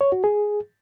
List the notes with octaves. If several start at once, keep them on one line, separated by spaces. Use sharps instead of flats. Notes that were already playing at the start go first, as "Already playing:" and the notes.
C#5
F#4
G#4